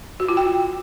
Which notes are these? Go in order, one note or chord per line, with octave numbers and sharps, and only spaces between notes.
F#4
F4
G5